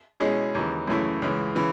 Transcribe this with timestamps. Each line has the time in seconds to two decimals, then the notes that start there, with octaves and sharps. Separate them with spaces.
0.20 B2 G#3 C#4 E4 G#4
0.55 D#2 C#3 E3
0.87 F#2 C#3 E3 A3 E4
1.22 C#2 C#3 E3
1.55 C#3 E3